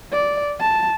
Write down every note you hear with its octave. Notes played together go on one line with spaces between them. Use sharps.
D5
A5